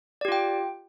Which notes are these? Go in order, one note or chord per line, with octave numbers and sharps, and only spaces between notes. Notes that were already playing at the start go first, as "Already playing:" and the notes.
F4 G4 D5 G5